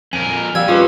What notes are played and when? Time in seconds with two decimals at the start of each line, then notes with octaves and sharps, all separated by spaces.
0.13 F2 A#4 G#5
0.55 G3 A#3 E6 G#6
0.68 G#3 C#4 F4 G4 G#4 B4